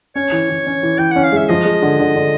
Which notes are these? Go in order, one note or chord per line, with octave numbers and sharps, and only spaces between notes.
C#4 C#5
E3
E3
C#4
E3
E3 G5
C#4 F#5
F5
G#3 E5
F3 D#5
G#3
D3
D3
D3